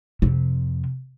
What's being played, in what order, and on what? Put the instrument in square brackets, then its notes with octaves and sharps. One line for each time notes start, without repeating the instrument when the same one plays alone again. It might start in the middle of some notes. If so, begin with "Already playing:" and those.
[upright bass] F2 C3